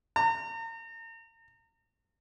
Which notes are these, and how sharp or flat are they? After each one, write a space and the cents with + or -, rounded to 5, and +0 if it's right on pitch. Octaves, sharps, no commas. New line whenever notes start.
A#5 -40